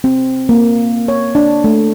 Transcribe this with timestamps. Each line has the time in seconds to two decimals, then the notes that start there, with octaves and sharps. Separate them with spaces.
0.04 C4
0.49 A#3
1.08 C#5
1.35 D4
1.64 A3